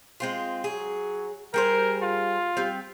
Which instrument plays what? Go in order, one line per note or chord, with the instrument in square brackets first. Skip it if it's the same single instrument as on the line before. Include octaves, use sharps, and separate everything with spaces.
[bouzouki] G#3 C4 F4
[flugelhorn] F#3 [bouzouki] G#4
[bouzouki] G3 G#4 C5 [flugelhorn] A#4
[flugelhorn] F4
[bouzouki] G3 C4